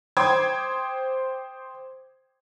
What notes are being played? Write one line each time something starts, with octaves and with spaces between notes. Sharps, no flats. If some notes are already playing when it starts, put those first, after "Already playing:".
C5 G5 C6 D6 D#6 G#6